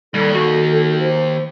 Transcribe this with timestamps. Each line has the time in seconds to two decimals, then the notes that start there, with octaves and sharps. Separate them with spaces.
0.14 D#2 G3 A4
0.35 F#4
1.00 C5